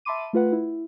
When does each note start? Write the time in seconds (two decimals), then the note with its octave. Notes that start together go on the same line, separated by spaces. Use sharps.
0.05 E5 A5 B5 C6 D6 D#7
0.33 A3 F4 B4 F#5
0.52 E4